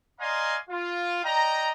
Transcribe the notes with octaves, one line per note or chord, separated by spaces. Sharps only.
D5 D#5 F5 G#5 A#5 C6
F4
D5 D#5 G5 A#5